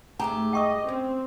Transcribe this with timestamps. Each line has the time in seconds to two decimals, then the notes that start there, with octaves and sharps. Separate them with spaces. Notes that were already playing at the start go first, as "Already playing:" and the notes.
0.19 G#2 A3 G4 G#4 G#5 A#5
0.53 D#5 G5 C#6 D#6
0.88 C4 C#4